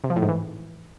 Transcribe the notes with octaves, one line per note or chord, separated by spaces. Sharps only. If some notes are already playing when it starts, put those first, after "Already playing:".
C3
F3
A2
G#2
E3